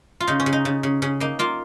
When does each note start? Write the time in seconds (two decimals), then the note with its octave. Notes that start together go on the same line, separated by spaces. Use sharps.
0.20 F4
0.27 C#3 D#4
0.40 C#4
0.46 C#3
0.53 D#4
0.65 C#3
0.83 C#3
1.02 C#3 C#4
1.20 A#3 D#4
1.39 A#3 F4